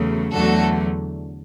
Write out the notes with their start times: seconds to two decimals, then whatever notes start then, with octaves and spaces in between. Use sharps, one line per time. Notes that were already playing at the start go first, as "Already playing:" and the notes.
Already playing: E2 C#3 F#3 A3
0.33 E2 D3 F#3 A3 F#4 A4